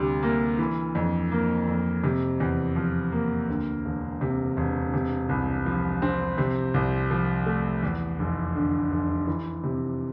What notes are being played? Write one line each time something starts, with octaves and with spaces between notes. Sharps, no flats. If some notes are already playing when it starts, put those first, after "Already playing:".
Already playing: D2 C3 G3
A#3
E3
F2
A#3
F2
C3
E2
F3
A#3
D2
E1
C3
E1
C3
C2
F3
C4
C3
C2
F3
A3
E2
F1
D3
F1
E3
C3